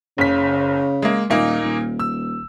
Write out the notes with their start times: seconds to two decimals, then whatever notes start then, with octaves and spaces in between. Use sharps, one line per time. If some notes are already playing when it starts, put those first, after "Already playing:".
0.18 F#1 C#3 B6
1.02 G#3 A#3
1.30 D#1 A#2 A#3 D#4
1.64 D#1
2.00 E6